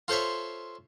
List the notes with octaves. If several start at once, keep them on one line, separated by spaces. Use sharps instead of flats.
F4 A4 C5 C#5 E5